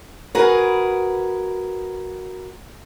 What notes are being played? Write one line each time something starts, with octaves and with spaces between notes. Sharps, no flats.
F#4 G#4 A#4 B4